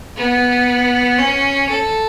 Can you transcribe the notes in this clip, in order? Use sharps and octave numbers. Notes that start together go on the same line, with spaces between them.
B3
C#4
A4